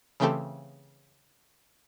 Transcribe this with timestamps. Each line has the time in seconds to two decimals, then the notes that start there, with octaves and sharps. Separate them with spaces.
0.20 C#3 E3 A3 C4 G4 A4